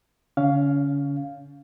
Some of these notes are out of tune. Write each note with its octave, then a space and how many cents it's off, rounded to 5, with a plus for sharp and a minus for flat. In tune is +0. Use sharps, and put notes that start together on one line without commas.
D3 -40 C#4 +25 F5 +0